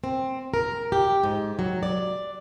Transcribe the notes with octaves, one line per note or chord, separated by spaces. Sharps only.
C4
A#4
G4
G#2
F#3
D5